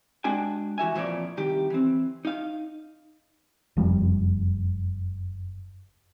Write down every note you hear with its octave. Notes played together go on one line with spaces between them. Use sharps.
G#3 D4 F#4 G5 G#5
E3 F#4 E5 G#5
F2 A#2 E3 F3 C#5 D5
C2 D#3 G4
E3 C4
D#4 F5
F#1 F2 F3 G3